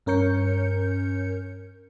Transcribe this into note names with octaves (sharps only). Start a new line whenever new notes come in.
G2 C#4 A#4 C#5 G6 C#7